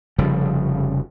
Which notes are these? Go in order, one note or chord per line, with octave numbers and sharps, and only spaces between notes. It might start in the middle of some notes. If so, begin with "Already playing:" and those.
F1 C#3 F3 G3